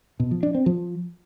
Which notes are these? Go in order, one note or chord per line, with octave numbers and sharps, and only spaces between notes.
B2
F3
D4
C4
F3